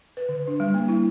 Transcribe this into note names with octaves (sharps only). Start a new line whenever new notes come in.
B4
D3
D4
G3
A#3
E4